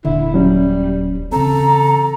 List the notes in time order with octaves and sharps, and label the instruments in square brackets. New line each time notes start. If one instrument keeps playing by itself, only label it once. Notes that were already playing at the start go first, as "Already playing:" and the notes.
[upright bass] D#1 [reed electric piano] D3 [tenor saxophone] E4
[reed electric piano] F#3 C#4 [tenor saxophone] G3
[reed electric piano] C#3 C4 [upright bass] E3 [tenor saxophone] A4 [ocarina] A#5